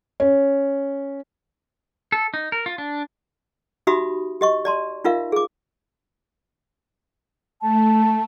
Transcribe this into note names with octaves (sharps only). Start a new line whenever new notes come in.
C#4
A4
D#4
A#4
F4
D4
D#4 F#4 G4 E5 B5 D#6
G4 D#5 C#6
D5 A5 C6
D#4 F4 A#4 E5 F5
G#4 D6
A3 A5